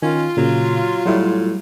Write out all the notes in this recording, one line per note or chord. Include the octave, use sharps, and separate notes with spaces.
D#3 C#4 F4
A#2 C#3 F#3
A2 F#3 G3 E4